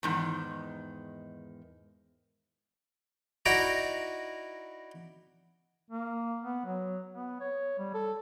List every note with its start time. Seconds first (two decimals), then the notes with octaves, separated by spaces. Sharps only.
0.03 E2 G#2 D#3
3.46 D#4 E4 F#4 D5 A#5
5.91 A#3
6.43 B3
6.65 F#3
7.14 B3
7.40 C#5
7.79 G3
7.94 A4